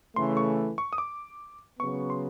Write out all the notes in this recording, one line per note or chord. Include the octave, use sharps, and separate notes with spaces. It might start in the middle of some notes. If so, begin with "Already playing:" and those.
C#3 E3 A3 C6
C#6
C#6
D#6
D6
C#3 F#3 B3 C#6
C6